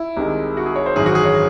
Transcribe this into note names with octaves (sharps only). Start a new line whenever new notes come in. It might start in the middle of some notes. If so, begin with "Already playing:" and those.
Already playing: E4
C2 C3 D#3 G#3
F#4
G#4
C#5
C5
G#1 F#2 E3 G#4
F#4
G#4
C#5